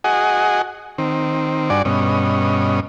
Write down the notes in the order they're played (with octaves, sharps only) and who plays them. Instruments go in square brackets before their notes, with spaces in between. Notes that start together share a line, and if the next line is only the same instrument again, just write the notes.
[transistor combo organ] F#4 G#4 D#5 F#5 G#5
D#3 C4
G2 D4 F#4 D5 G#5
G2 B2 C#4 D#5